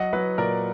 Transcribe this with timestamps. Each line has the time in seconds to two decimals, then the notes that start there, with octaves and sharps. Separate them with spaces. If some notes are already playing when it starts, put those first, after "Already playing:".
Already playing: F#3 D#5 F#5
0.13 F#3 B4 D#5
0.38 A#2 A#4 D5